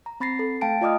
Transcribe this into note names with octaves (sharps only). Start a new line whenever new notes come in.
A#5
C4 B5 A6 A#6 C7
A4
A3 F5 G5 A5 A6 D7
F4 D5 D#5 D6 D#6 F6